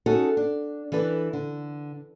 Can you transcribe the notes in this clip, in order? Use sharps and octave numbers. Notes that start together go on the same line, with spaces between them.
C#4 D#4 F#4 G#4 A4
D4
E3 D4 A4 B4
D3